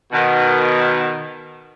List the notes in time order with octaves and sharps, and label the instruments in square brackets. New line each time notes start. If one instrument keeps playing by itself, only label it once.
[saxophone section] B2 D#3